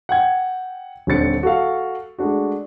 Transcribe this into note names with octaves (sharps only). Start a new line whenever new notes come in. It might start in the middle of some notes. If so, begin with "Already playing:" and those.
F#5 G5 G#6
D#1 D3 C4 A6 C#7
F#4 A4 F5
G#3 A3 D4 F#4